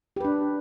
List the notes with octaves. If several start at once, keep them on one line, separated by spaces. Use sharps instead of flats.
D4 G4 B4